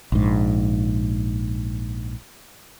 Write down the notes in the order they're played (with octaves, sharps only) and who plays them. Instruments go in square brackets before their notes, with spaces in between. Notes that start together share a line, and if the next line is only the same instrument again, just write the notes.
[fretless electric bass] A#1 G#2